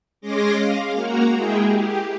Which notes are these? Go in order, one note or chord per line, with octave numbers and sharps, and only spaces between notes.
G#3 C#4 G#4 C6 D6 A#6
F5
A#3 F#4 A#5
G#3 E4 G#4 G5
G4